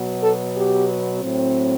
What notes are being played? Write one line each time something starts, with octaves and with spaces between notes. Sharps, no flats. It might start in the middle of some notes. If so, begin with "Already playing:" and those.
Already playing: B2 F#3 B3
A4
G4
A2 F#3 C4